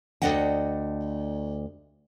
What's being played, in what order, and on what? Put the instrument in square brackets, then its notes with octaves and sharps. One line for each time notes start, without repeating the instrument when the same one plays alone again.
[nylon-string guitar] D2 G2 D4 D#5 F#5 G5